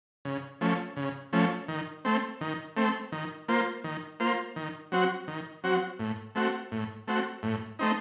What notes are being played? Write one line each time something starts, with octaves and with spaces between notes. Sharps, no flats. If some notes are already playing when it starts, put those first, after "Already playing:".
C#3
F3 A3 C#4
C#3
F3 A3 C#4
D#3
A3 C4
D#3
A3 C4
D#3
A#3 F4 C5
D#3
A#3 F4 C5
D#3
F#3 C4 F#4
D#3
F#3 C4 F#4
A2
A3 C4 F#4
A2
A3 C4 F#4
A2
A3 C4 D#4